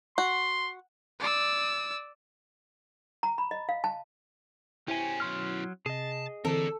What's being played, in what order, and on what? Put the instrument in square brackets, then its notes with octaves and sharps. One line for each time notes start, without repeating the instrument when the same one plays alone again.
[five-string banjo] F#4 [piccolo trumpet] C6
[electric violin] D5 E6
[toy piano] A#5
B5
D#5
F5
A5
[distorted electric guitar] B2 C#4 [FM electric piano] E4 [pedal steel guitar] G4 C5 G#5
[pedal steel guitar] F#3 C6 F6
[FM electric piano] C3 [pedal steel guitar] G#4 D#5 [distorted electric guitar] A5
[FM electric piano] D3 E3 C4 [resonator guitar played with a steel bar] A4 [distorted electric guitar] A#4 D5